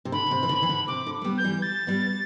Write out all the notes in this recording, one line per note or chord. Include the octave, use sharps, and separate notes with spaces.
C3
D3 B5
D3
C3
E3
D3
E3
D3
C3 D6
D3
A3
G3 B3
G6
E3 G3
A6
G3 B3